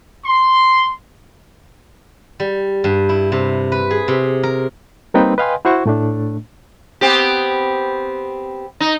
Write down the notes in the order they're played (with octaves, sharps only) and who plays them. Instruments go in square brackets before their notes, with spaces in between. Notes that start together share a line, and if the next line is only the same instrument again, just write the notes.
[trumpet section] C6
[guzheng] G3
G2
E4
C3
B4
G#4
C3
A#4
[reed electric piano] G3 A#3 C4 D#4 B4 G5
B4 D#5 F5 G5 G#5 C6
E4 F#4 C5 F#5 C#6
A2 A3 D4
[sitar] B3 C4 G4
D#4